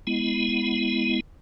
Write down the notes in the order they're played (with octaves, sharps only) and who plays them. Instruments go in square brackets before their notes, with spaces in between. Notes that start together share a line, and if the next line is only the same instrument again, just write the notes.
[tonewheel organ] G#3 B3 E4